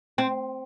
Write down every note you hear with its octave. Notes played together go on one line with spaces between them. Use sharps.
C4